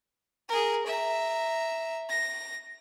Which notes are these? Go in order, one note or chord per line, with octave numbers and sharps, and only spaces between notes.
G#4 A#4
E5 A#5
A#6